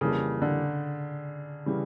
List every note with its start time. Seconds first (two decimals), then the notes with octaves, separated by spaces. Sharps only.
0.01 F2 C#3 E3 G3 A#3
0.42 D3
1.66 C#3 E3 G3